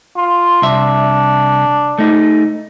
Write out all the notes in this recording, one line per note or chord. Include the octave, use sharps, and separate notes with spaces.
F4
C2 D4 E5
A3 D#4